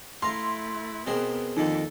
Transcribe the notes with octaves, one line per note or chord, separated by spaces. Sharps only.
A3 E4 F5 A#5 C6
B2 B3 C4 G#4 A#4
F2 D3 D#3 A#3 D#4 A4